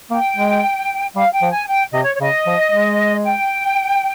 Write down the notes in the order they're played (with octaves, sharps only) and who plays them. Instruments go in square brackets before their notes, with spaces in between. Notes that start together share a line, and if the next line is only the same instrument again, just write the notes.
[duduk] A#3 [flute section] G5
[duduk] G#3
[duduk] G3 [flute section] F5
[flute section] G5
[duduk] F3
[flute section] G#5
G5
[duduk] C3 [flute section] D#5
[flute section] C#5
C#5
[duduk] C#3 [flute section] D#5
[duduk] F3
G#3
[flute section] G5